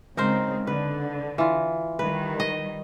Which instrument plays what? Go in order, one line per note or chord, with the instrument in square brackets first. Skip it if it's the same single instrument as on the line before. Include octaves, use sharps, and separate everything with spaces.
[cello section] C#3 G#3 C4 [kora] D#4 A#4 C5
[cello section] D3 [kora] B4
[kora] E3 F4
[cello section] D#3 G3 [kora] B4
[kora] D#5